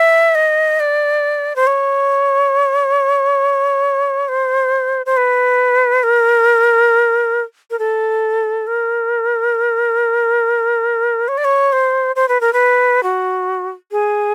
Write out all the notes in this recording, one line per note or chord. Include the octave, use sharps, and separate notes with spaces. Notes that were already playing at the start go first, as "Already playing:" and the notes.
Already playing: E5
D#5
D5
C5
C#5
C5
C5
B4
A#4
A#4
A4
A#4
C#5
D5
C#5
C5
C5
B4
A#4
B4
F#4
G#4